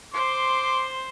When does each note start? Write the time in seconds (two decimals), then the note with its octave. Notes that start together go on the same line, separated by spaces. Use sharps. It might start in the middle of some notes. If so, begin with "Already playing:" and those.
0.14 C5 C6 D6